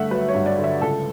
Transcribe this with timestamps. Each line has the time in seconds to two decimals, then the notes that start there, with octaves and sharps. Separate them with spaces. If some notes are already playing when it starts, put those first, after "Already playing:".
Already playing: G2 D3 A3 E5 F#5
0.11 F#3 B4
0.28 C#5
0.35 G2
0.46 D5
0.58 D3
0.64 E5
0.82 C#2 A4